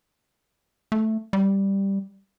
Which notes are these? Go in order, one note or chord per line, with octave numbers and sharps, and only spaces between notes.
A3
G3